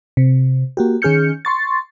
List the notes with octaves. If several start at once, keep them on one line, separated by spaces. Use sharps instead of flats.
C3
A#3 F#4 G4
D#3 C#4 G#4 F6 G6 C#7
C6 C#6 A6